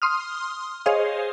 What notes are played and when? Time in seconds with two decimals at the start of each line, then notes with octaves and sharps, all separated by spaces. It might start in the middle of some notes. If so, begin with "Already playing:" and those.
0.02 C6 D#6 F6
0.86 G#4 C5 C#5 D#5 F5